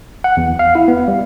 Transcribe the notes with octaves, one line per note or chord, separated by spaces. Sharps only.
F#5
E2
F5
E4
B3
G3